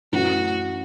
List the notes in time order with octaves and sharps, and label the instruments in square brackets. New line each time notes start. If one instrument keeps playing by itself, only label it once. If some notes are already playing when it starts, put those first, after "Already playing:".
[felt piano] F#2 E3 A3 C#4 [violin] F#4